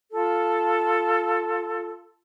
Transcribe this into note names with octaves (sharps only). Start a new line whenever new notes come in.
F4 A4